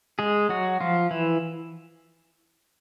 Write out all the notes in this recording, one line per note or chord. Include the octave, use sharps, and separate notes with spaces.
G#3 G#4
F#3 F#4
F3 F4
E3 E4